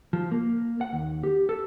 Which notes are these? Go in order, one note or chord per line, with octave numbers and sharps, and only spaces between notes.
F3
A#3
F#5
D#2
G4
A4